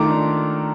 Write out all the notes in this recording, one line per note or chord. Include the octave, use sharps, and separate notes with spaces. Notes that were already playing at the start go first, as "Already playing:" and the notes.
Already playing: D#3 A3 F4 A#5 C6 D6
D4